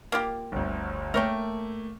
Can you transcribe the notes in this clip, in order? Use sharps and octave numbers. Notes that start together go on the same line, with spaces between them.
A#3 F4 G4
G1 D2
A3 A#3 A#4 C#5 G5